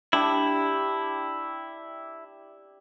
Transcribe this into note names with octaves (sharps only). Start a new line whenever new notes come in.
D4 E4 G4